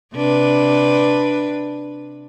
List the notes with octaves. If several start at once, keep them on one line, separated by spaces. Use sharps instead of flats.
C3 D4 B4